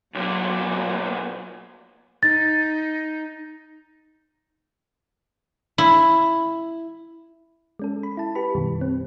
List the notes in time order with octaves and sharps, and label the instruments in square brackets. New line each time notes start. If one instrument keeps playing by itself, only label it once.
[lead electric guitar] B1 A#2 [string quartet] F#3
[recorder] D#4 [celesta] A6
[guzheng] E4
[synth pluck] G#3 C#4 A4
B5
E4 A5
G4 B4 B5
F#2 B2 D#3 G3
C4